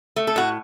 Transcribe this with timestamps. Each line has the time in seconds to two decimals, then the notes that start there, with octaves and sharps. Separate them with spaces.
0.16 A3
0.27 A4
0.36 A2 F#4